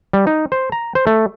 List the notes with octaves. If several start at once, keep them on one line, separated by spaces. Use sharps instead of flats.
G3
D#4
C5
A#5
C5
A3